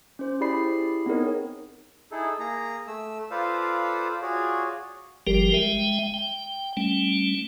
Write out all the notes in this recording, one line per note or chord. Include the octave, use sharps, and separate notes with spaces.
C#4 C5
E4 G4 G#4 D5 B5 C7
B3 C4 D#4 G#4 A#4 C#5
D#4 E4 G#4 A4
A#3 G#4 A#5
A3 E6
F4 A4 B4 C5 D5 F5
F4 F#4 G#4 C#5 D5
G1 F3 G3 G4 A#4
G#3 E5 G5
G5
G3 A3 C#4